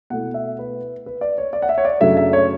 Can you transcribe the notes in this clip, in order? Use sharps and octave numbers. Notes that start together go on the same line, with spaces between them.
B2 A3 E4 F#5
E5
B4
B4
D5
C#5
D5
F#5
E5
C#5
D5
F#2 C#3 F#3 A3 D4 E5
E5
C#5